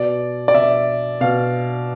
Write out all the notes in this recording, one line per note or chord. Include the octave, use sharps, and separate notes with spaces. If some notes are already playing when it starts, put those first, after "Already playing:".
Already playing: B2 D5
D5
B2 E5
B2 F5